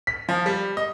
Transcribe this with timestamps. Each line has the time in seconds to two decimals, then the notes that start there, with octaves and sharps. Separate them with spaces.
0.07 B6
0.29 F3
0.46 G3
0.77 D#5